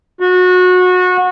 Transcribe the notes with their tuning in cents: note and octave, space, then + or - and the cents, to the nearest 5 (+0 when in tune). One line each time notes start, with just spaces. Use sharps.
F#4 -25